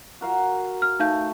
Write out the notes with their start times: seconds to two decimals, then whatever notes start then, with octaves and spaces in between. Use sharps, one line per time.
0.21 F#4 A#4 F5
0.82 F6
1.00 A3 D#4 F5 G6